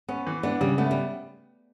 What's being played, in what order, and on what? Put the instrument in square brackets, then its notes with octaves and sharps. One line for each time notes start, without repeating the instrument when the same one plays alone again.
[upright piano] B3 [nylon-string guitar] C#4
[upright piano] E3
[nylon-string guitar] B3 [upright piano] D4
[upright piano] C#3 [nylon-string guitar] G3
[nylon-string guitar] A3 [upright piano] B3
[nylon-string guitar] G3